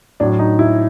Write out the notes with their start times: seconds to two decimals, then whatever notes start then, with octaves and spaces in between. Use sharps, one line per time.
0.20 A2 F#3 D4
0.39 D#4
0.59 E4